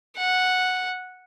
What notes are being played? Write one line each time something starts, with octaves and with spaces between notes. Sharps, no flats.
F#5